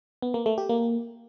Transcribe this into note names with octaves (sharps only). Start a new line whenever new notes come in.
B3
A#3
A3
G4
A#3